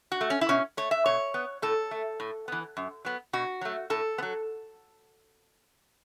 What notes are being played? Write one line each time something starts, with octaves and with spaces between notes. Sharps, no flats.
F#4
A3
C#4
E4
B2 C#4
A3 C#5
E5
B2 C#5
B3
A2 A4
A3
A2
E3 B3
F#2
F#3 B3
B2 F#4
F#3 A3
A2 A4
B3
F#3